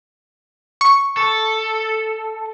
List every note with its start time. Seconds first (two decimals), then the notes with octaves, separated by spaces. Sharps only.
0.81 C#6
1.17 A4